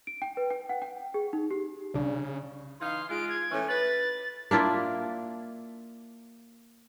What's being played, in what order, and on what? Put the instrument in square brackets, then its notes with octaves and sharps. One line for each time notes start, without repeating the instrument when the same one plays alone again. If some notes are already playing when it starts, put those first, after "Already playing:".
[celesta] D7
G5
B4
G5
F#5
G5
G#4
D#4
G4
[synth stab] C2 D4 [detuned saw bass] C#3
[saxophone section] E3 D#4 F5 [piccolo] C6
[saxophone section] G#3 F4 [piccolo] D7
[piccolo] G#6
[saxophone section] A2 E3 C#4
[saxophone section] B4 [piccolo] A6
[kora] A#3 D4 E4 F4